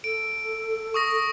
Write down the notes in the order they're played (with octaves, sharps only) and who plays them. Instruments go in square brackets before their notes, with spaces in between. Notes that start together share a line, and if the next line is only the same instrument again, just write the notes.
[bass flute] A4 [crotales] D7
[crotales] C#6 D#6 A#6